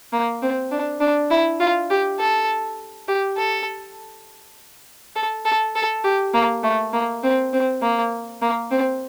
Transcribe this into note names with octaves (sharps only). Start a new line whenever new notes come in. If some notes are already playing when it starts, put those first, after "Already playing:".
A#3
C4
D4
D4
E4
F4
G4
A4
G4
A4
A4
A4
A4
G4
A#3
A3
A#3
C4
C4
A#3
A#3
C4